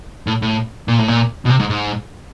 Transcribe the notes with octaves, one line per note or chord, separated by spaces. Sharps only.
A2
A2
A#2
A2
A#2
B2
C3
G#2
G#2